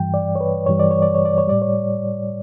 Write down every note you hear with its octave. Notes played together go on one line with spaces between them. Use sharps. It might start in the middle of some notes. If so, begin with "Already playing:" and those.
Already playing: G2 E3 G3 G5
D5
C#5
B4
G2 E3 G3 C#5
D5
C#5
D5
C#5
D5
C#5
A2 G3 D5
C#5